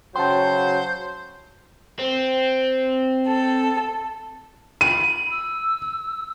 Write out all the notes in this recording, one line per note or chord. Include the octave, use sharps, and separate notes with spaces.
C#3 F#3 C5 G5 A5 C6
C4
A4
B5 D#7
E6